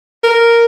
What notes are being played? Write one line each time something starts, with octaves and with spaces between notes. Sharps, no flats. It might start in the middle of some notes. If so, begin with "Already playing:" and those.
A#4